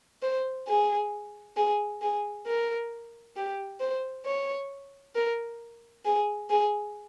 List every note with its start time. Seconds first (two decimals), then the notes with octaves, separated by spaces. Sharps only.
0.22 C5
0.68 G#4
1.56 G#4
2.02 G#4
2.47 A#4
3.36 G4
3.80 C5
4.25 C#5
5.15 A#4
6.05 G#4
6.50 G#4